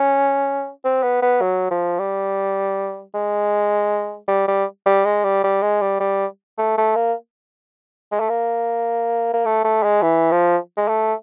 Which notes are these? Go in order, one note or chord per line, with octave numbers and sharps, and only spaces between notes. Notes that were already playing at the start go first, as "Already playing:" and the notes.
Already playing: C#4
C4
B3
B3
F#3
F3
G3
G#3
G3
G3
G3
G#3
G3
G3
G#3
G3
G3
A3
A3
A#3
G#3
A3
A#3
A#3
A3
A3
G#3
E3
F3
G#3
A3